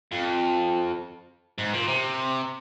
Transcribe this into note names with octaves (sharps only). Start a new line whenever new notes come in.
F2
G#2
A#2
C3